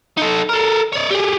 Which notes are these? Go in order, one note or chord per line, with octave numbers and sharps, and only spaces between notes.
D#4 A4
A4 A#4
C#5 D5
G4 G#4